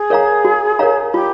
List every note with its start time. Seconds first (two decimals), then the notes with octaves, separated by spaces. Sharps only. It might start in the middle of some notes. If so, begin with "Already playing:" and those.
Already playing: G#4
0.10 A#4 C#5 F5 A#5
0.45 F#4
0.79 A#4 C#5 F5 A#5
1.13 F4 G4